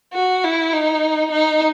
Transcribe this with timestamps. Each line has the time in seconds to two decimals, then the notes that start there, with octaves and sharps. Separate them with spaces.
0.14 F#4
0.44 E4
0.73 D#4
1.31 D#4